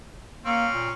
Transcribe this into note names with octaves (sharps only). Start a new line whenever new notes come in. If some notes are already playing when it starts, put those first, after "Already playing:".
A#3 C4 C#4
A#2